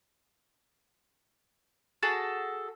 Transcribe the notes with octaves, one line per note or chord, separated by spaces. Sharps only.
F#4 G#4 A4 A5